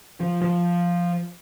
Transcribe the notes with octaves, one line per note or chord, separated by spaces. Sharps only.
F3
F3